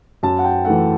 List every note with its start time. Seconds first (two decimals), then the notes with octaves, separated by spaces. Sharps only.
0.23 F#2 A5
0.38 F#5
0.45 G5
0.65 E3 A3 F#5